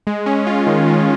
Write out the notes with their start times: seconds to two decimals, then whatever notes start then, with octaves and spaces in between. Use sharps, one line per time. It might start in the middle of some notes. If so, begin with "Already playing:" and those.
0.07 G#3
0.26 C#4
0.47 F4
0.67 D#3
0.87 G#3